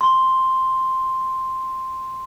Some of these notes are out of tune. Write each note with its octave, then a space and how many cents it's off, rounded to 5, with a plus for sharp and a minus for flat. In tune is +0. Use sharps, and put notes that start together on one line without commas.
C6 +0